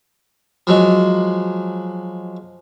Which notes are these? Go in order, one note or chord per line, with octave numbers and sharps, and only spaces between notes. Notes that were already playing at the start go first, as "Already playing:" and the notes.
F3 F#3 G#3